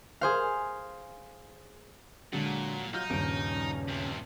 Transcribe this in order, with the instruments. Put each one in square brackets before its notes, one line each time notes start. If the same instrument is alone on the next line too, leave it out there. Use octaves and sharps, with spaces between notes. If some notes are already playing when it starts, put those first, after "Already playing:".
[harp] G#4 C5 F5
[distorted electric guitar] A#2 [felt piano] D3 G#3 [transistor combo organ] F#3
[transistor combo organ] F#3 F4 [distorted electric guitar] D#4 [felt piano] F6 G6
[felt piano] D#1 G2 D7 [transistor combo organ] C#3
[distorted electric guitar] D2 C3